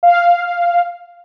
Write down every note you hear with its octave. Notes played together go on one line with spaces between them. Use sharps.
F5